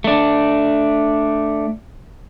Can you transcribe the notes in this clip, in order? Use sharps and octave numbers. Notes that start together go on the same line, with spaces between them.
A3 D4